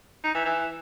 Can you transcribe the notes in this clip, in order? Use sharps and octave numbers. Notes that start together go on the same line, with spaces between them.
D#4
E3
E3